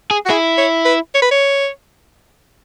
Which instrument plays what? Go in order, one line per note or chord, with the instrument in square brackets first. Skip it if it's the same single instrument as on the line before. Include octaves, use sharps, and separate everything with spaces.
[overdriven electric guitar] G#4
[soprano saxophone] F#4
[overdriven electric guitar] E4 [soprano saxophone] G#4
[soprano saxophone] C#5
B4
C#5
B4
C#5